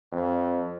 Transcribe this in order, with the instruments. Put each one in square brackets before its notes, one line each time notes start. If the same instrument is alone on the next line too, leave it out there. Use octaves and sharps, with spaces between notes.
[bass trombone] F2